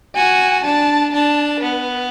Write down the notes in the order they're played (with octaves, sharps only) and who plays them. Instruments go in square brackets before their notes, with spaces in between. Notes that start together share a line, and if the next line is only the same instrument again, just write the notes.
[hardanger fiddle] F#4 [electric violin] G#5
[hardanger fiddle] D4 [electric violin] A5
[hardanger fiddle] D4 [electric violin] A5
[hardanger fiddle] B3 [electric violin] B4